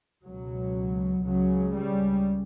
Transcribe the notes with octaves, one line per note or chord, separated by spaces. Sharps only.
C#2 B2 F#3
C#2 C#3 F#3
G3